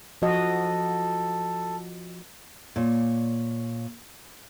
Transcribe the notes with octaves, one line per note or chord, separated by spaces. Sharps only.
F3 F#4 A4 D#5
A#2 C#5